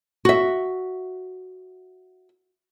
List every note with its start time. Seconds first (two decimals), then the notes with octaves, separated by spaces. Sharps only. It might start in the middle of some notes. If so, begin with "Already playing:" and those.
0.25 F#4 E5